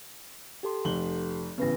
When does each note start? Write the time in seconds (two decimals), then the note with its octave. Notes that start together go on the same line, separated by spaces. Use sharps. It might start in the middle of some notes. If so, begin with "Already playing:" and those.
0.63 G4 A4 C6
0.85 F1 F#7 G7
1.58 A1 C#3 B3 B4 A#6